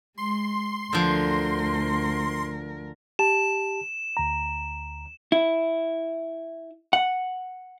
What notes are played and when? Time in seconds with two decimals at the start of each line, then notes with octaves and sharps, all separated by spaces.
0.18 G#3 C6
0.93 D2 D3 F3 A#4
3.19 G4 A5 E7
4.17 D2 A#5
5.32 E4
6.93 F#5